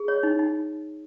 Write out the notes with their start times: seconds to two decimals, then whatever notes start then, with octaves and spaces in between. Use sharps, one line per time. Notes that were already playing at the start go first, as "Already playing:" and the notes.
Already playing: G#4
0.08 C#5
0.23 D#4
0.39 D#4